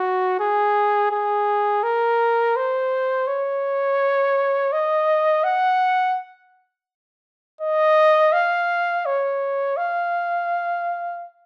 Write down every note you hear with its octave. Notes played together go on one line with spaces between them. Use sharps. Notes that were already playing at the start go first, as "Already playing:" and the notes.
Already playing: F#4
G#4
G#4
A#4
C5
C#5
D#5
F#5
D#5
F5
C#5
F5